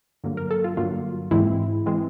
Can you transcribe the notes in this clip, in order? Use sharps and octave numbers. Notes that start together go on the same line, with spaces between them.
G2 D3 F#3 A#3
A#4
A4
F4
G2 D3 F#3 A#3 F4
G#2 E3 G#3 C4 E4
E3 G#3 C4